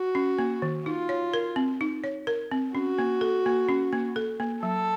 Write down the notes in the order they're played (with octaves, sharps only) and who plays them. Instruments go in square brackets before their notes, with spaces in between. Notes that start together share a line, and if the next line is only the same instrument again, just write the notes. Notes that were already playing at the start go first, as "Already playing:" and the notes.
Already playing: [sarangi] F#4
[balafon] C#4
A#3
D#3
[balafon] D#4 [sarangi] F4
[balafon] C#5
A#4
C4
D#4
C#5
A#4
C4
[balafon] C#4 [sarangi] F#4
[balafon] A#3
A4
A#3
C#4
A#3
A4
A#3
[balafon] F#3 [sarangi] A4